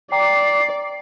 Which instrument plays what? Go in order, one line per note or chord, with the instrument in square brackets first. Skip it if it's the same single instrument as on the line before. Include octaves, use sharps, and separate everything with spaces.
[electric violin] D5 [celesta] G5 A#5 D6 [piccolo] C7